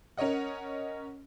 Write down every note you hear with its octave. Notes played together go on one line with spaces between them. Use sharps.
C#4 A#4 C#5 D#5 F#5